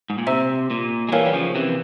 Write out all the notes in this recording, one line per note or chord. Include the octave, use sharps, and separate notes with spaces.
G#2
A#2
C3 C5 E5 A#5 E6
A#2
G#3
E3 G3 A#4 C#5 F5 G#5
G3
C#3 F3
C3 E3